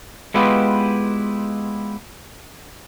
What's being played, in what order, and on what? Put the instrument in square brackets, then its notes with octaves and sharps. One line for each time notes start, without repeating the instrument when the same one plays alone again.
[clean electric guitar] G#3 B3 E4 F4 G4 B4